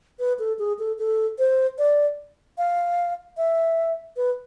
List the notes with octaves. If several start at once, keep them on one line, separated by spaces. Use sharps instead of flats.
B4
A4
G#4
A4
A4
C5
D5
F5
E5
B4